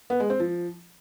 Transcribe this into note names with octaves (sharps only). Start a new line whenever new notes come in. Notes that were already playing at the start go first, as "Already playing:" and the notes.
B3
G#3
C4
F3